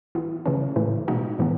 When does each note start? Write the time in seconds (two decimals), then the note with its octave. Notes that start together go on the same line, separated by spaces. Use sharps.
0.15 E3 B3 E4
0.46 C#3 E3 A3 C#4
0.76 A2 E3 A3
1.08 B2 G#3 D#4 F#4
1.39 A2 E3 B3